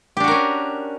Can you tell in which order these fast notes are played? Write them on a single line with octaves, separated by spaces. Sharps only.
G4 D4 F#4 A#4 C#4